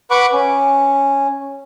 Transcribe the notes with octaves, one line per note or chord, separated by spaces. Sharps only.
B4 F#5 B5 C#6 D6
C#4